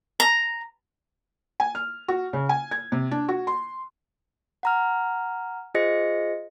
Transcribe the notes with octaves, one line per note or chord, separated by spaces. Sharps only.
A#5
G#5
F6
F#4
C#3
G#5
G#6
C3
D4
F#4
C6
F#5 A#5 F6
F4 G#4 C5 D#5 A#6 C#7